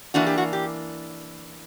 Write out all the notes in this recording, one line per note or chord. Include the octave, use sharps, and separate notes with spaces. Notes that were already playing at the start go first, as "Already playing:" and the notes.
E3 A#3 D4 F#4
G4
F#4
G4